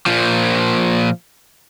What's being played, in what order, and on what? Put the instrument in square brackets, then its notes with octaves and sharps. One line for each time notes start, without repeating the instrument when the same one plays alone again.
[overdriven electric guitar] A#2 F3